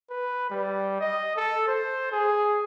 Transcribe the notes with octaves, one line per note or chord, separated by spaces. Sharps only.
B4
G3
D#5
A4
C5
G#4